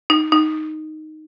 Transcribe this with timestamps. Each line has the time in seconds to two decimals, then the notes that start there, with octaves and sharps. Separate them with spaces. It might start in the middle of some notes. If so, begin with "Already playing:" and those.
0.10 D#4
0.32 D#4